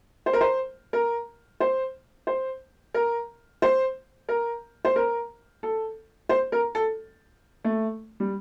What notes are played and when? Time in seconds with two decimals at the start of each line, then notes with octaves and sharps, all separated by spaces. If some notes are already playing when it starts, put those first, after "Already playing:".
0.26 C5
0.33 A#4
0.41 C5
0.93 A#4
1.60 C5
2.27 C5
2.94 A#4
3.62 C5
4.29 A#4
4.85 C5
4.96 A#4
5.63 A4
6.29 C5
6.52 A#4
6.75 A4
7.64 A3
8.20 G3